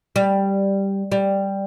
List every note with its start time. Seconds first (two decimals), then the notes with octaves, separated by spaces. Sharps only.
0.16 G3
1.12 G3